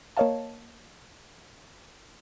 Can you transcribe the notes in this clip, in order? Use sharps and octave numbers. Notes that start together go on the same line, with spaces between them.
A#3 A#4 C#5 D#5 F5 A5